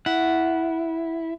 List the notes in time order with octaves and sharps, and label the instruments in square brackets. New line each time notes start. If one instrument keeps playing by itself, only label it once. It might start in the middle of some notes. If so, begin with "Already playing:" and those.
[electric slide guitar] E4 [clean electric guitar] F#5